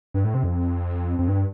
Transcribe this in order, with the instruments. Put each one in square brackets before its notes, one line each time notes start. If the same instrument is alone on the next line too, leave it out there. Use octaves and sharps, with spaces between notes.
[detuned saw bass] G2
A2
C3
F2
F2
G2